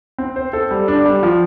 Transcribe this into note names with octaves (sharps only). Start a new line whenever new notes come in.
C4
C5
A4
G3
D4
G3
F3